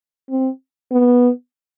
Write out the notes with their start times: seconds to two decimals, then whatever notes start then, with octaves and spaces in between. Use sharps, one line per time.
0.30 C4
0.92 B3